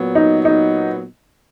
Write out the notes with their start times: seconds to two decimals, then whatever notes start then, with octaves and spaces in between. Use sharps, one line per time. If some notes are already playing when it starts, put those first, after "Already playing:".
Already playing: A#2 F#3 B3
0.15 D#4
0.45 D#4